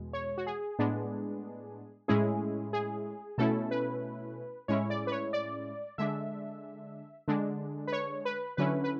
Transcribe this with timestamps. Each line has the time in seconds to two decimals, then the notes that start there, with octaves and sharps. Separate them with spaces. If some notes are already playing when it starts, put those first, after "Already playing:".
Already playing: E2 B2 G#3
0.13 C#5
0.38 F#4
0.46 G#4
0.79 A2 G#3 B3 D4
2.08 A2 G#3 C#4 E4 G#4
2.73 G#4
3.38 B2 A3 C#4 E4 A4
3.71 B4
4.68 A2 G#3 C#4 E4 C#5
4.90 D5
5.07 B4
5.12 C#5
5.33 D5
5.98 D3 G#3 D4 E5
7.28 D3 G#3 D4
7.87 B4
7.92 C#5
8.25 B4
8.57 D3 F#3 C#4 E4 B4
8.84 B4